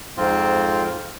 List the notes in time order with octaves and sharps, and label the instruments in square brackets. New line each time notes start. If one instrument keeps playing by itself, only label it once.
[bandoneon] F2 G#2 C4 F4